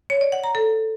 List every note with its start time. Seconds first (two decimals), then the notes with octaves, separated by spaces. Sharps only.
0.10 C#5
0.21 D5
0.32 F#5
0.44 A#5
0.55 A4